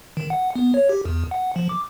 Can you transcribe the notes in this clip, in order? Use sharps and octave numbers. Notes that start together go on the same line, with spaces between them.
D#3
F#5
B3
C#5
G4
E2
F#5
F3
D6